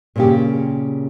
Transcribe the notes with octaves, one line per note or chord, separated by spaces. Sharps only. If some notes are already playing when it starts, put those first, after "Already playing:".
A#2 C#3 G4